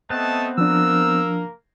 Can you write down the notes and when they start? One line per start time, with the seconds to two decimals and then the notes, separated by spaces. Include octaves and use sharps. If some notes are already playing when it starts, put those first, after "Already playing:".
0.10 A3 B3 C4 D#5 A5
0.58 F3 A#3 D4 A#4 E6